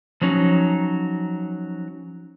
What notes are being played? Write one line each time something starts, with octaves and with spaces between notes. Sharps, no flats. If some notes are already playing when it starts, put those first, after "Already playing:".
F3 F#3 C#4 D#4